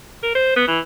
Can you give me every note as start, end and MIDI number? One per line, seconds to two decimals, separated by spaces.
0.23 0.32 70
0.35 0.56 72
0.56 0.66 59
0.68 0.79 52